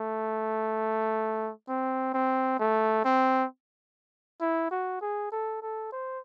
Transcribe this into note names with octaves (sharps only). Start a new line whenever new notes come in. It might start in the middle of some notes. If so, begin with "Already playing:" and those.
Already playing: A3
C4
C4
A3
C4
E4
F#4
G#4
A4
A4
C5